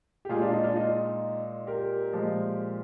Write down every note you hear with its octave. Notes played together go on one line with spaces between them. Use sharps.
G4
A#2 G#3 F4 G#4
D4 F4
D#4
D4 F4
D#4
G4 A#4
A#2 F3 G#3